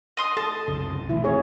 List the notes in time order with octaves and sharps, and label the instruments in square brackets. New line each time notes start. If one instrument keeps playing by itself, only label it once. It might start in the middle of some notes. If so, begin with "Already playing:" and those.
[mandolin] D#5 C6 D#6
[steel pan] A4 [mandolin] A5
[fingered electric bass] C2 F#2 C#3
[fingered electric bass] B2 E3 A3 [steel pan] E4
[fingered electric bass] G#1 C4 [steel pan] G#4 C#5